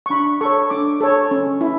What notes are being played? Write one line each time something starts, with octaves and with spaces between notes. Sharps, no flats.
C#6
D4 B5
A4 C#5 C#6
D4 D6
A4 C#5
C#4
E4